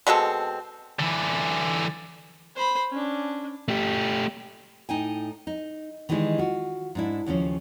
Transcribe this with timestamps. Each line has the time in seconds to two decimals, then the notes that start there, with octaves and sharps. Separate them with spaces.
0.07 B2 G#3 C4 A4
0.99 D3 E3
2.56 C5 B5
2.91 C#4 D4
3.68 A3 G4
4.89 A2 D#4 G5 G#5
5.47 D#4
6.09 D#3 E3 G3 G#3 D#4
6.38 F4 F#4
6.95 G#2 D4 E4
7.26 D#2 C#3 F3 C#4